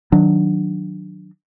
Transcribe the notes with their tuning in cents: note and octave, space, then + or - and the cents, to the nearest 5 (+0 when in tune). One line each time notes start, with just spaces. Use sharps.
D#3 +0 F#3 -5 D4 +5